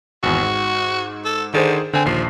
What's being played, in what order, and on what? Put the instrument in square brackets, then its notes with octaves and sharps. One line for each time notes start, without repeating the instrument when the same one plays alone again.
[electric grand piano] G#1 E2 [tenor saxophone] F#4
[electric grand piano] G#2
[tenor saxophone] A4
[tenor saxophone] D3 [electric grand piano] D#3 G#4 C5
[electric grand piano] D3 G#5 [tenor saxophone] C4
[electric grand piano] A#1 D#2 C7 [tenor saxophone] F3